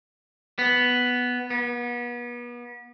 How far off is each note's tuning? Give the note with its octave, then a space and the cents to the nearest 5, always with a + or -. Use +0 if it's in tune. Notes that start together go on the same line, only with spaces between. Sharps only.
B3 +0
B3 -35